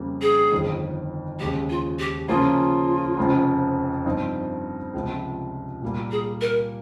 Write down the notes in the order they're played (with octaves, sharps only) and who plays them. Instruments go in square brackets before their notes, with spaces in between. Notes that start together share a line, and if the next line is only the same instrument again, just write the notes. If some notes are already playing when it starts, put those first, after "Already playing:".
Already playing: [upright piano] F2 C#3 G3 A#3
[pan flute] G#4
[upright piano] G1 F2 D#3
[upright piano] D#2 C#3 G#3 [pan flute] G4
[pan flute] F4
G4
[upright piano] C#3 F3 A#3 C#4 G#4 [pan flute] F4
[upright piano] F1 F2 C#3 F3
G2 F3 C4 D#4
C#2 C3 F3
A#2 G3 A#3
[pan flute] G#4
A#4